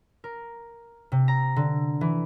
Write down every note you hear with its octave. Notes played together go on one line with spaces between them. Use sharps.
A#4
C3
A#5
D3
E3